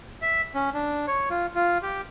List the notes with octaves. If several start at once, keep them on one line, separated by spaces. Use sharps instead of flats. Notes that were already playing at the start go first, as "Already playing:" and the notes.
E5
C#4
D4
C#5
F4
F4
G4